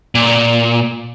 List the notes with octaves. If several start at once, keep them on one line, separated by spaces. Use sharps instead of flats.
A#2